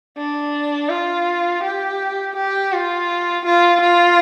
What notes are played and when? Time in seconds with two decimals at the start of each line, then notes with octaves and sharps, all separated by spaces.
0.18 D4
0.90 F4
1.63 G4
2.37 G4
2.72 F4
3.45 F4
3.81 F4